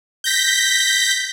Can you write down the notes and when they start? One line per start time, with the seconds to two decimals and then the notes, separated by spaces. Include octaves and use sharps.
0.24 G6 A#6 B6